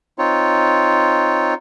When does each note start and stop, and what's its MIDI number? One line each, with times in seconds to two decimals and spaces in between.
0.18 1.54 60
0.18 1.54 63
0.18 1.54 65
0.18 1.54 73